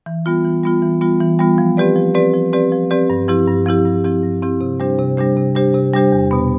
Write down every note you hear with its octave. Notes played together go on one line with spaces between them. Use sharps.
E3
G3 B3 F4
E3
G3 B3 F4
E3
G3 B3 F4
E3
G3 B3 F4
F3
C4 G4 B4 D5
F3
C4 G4 B4 D5
F3
C4 G4 B4 D5
F3
C4 G4 B4 D5
G2
F3 C4 E4 G4
G2
F3 C4 E4 G4
G2
F3 C4 E4 G4
G2
F3 C4 E4 G4
C3
G3 D4 G4 C5
C3
G3 D4 G4 C5
C3
G3 D4 G4 C5
C3
G3 D4 G4 C5
E2
B2 B3